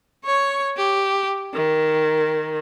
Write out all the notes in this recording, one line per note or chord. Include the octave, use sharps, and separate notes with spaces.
C#5 C#6
G4
D#3